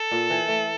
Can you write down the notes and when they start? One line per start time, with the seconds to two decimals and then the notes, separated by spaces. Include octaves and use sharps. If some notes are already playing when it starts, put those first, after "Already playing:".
Already playing: A4
0.11 A#2
0.30 E3
0.48 A3